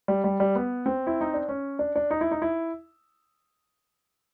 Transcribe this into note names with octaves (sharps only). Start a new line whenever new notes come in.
G3
G3
G3
B3
C4
E4
D#4
D4
C#4
D4
D4
D#4
E4
D#4
E4